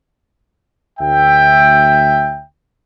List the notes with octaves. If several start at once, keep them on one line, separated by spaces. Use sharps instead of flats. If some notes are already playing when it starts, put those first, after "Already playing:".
D2 E5 G5